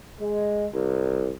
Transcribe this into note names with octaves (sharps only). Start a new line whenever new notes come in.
G#3
C2